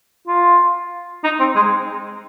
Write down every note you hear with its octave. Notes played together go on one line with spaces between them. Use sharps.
F4
D#4
C4
G#3